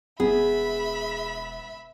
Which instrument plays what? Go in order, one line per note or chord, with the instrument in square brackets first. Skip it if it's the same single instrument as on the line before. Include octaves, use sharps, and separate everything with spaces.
[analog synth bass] E1 [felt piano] B3 [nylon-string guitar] G#4 [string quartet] E5 B5